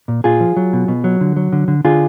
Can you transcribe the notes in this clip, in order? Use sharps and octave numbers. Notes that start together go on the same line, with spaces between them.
A#2
A#2 F4 G#4
F3
F#3
B2
B2
F#3
D3
F#3
D3
D3
D3 F4 G#4